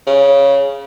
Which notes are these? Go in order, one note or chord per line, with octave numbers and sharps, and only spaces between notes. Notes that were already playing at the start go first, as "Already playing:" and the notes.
C#3